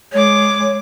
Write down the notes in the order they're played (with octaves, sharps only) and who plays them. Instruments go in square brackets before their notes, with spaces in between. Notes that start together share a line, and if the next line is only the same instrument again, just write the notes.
[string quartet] G#3 D6 [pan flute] C#5